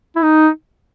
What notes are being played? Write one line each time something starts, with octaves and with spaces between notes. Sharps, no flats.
E4
D#4